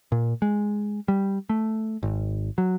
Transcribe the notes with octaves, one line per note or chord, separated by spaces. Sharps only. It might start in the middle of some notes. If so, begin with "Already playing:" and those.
A#2
G#3
G3
A3
G#1
F#3